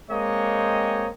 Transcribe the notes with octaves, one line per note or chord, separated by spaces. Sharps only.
G#3 A#3 C4 C#5 D#5 G5